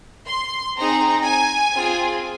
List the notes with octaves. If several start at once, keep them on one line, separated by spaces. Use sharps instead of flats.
C6
C4 D#4 G#4 A#5
G#5
C4 F4 G#4